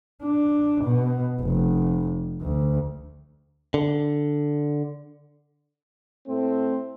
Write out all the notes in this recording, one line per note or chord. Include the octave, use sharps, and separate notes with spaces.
D4
B2
F1
D2
D3
A2 A3 C4